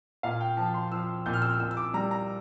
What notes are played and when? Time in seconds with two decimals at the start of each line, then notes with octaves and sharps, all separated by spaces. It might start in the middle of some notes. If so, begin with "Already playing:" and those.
0.23 A#2 F5
0.41 G5
0.57 F3 A5
0.74 C6
0.92 F3 E6
1.26 A#2 G6
1.33 F6
1.42 E6
1.50 F6
1.60 A#2 E6
1.71 E6
1.77 D6
1.94 G3 A#5
2.11 A#5